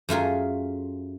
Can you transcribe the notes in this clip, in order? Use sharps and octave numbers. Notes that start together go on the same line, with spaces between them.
F#2 A3 F4 G#4